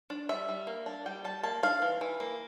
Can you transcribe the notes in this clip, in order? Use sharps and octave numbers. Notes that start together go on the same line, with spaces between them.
D4
G3 E5
G3
A#3
D4
G3 G5
G3 A5
A#3 A5
D4 F5
E3
E3
A#3